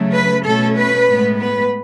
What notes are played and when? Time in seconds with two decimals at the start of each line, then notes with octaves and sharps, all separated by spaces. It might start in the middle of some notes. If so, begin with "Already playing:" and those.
Already playing: C#3 F#3 A3
0.12 B4
0.44 B2 A3 C#4 A4
0.76 B4
1.08 A2 G#3 B3
1.40 B4